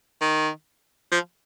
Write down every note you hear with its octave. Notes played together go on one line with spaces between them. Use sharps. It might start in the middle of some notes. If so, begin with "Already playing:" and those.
D#3
F3